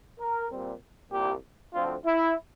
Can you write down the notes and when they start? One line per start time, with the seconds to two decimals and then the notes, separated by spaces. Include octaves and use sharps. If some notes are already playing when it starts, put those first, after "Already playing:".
0.20 A#4
0.51 A#2 G3 C4
1.12 C2 A#2 G3 A#3 G4
1.74 D2 D3 F3 C4 F4
2.05 E4